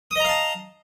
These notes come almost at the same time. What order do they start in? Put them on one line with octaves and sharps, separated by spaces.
D#6 D#5 A#5 F5 A5